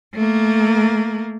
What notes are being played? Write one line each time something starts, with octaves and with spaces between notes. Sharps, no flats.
A3 A#3